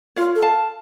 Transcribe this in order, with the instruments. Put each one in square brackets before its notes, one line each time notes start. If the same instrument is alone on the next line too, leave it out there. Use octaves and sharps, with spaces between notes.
[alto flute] F4 [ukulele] C#5 F5
[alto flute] A4
[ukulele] F5 A5